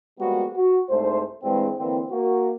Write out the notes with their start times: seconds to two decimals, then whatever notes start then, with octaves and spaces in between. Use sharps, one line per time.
0.19 F3 G3 G#3 A#3 B3 F#4
0.56 F#4
0.90 C2 G#2 A3 C5
1.43 G2 E3 G#3 C4
1.78 D3 E3 A#3 C4
2.11 A#3 F#4